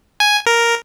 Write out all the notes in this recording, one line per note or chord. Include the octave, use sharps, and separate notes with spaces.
G#5
A#4